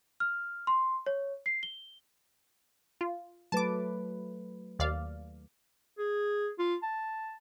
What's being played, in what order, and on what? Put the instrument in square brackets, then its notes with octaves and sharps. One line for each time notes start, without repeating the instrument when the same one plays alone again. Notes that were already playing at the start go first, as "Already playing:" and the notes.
[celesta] F6
C6
C#5
C7
G7
[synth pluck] F4
[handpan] F#3 A3 B4 [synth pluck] A5 D6
[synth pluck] D#2 D5 F5
[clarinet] G#4
F4
A5